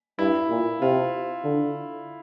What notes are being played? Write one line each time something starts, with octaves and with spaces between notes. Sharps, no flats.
G2 E4
A#2
C3 F4
D3